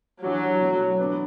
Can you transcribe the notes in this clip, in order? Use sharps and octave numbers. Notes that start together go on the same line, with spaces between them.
E3 F#3 D4 F#4
B2 A3 F#4
E3 B3 D4 B4